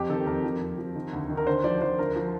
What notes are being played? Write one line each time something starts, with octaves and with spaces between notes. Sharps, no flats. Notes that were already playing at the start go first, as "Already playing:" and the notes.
Already playing: F2 G4
D#3 A4
F2 A#4
F3
F2
F3
D#3
D2
D#3
A#4
D3 C5
F3 D5
F3 C5
D2 A#4
F3